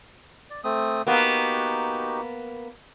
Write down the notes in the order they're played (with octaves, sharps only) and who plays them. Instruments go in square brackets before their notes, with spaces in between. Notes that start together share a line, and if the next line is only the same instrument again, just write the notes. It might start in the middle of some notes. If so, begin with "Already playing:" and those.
[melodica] D5
A3 C4 D#6
[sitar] A#3 B3 [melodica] D#4 F#4 G4